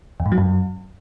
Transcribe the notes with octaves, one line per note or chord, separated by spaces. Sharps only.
E2
G#2
F#3
F#2